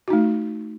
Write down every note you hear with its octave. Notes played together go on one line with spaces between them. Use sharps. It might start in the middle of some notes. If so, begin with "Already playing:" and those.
A3 D#4 F#4